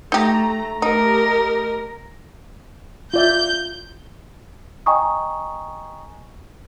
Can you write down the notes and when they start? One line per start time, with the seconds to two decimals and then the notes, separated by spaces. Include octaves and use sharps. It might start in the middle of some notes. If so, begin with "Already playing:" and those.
0.12 A3 D#4 G4 A#5
0.82 A3 D#4 G4 A#4 D#5
3.14 F4 D5 E5 G6
4.86 D#5 G5 G#5 A#5 C#6 D#6